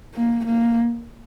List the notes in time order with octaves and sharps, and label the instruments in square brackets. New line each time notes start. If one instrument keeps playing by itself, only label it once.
[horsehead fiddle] A#3
A#3